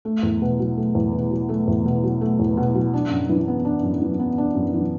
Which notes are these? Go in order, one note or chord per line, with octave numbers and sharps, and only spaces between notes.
A3
E2
B2
F#3
A3
E2
B2
F#3
A3
E2
B2
F#3
A3
E2
B2
F#3
D4
F#2
E3
B3
D4
F#2
E3
B3
D4
F#2
E3